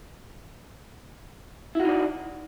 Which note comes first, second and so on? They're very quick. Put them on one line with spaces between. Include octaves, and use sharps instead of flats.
E4 F#4 D#4 D5